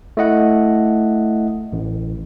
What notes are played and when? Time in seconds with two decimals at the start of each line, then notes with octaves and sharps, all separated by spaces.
0.17 A3 E4 D#5 F#5
1.73 A1